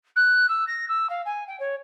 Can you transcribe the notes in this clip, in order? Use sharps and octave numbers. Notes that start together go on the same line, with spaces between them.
F#6
E6
A#6
E6
F5
G#5
G5
C#5